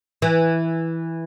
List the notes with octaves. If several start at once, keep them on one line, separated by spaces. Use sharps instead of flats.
E3